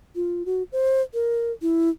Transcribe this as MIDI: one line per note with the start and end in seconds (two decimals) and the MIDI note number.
0.15 0.46 65
0.46 0.63 66
0.72 1.01 72
1.14 1.52 70
1.62 1.89 64